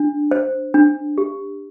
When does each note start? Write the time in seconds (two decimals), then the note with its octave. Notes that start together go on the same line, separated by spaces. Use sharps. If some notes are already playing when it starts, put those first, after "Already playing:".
Already playing: D4
0.31 C5
0.74 D4
1.18 G4